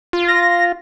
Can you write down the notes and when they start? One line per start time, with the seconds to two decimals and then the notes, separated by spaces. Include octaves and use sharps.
0.13 F4
0.28 A#6